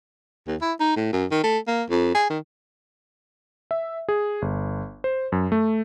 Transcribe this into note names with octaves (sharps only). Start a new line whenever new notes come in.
D#2
E4
D#4
A2
F#2
D#3
A3
A#3
F2
G#4
D#3
E5
G#4
G1
C5
F#2
A3